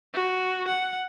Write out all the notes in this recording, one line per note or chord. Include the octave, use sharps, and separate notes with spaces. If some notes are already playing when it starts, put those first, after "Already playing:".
F#4
F#5